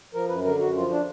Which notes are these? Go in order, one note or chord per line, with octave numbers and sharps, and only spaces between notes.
F3 A#4
F#2 B4
D3 A#4
F#2 F#4
F3 F4
D4